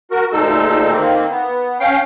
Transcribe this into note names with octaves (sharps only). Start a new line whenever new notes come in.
F#4 A#4
D2 A#2 G#3 D#4 A4 E6
D#3 A#3 C4
B3
C#4 F5 G5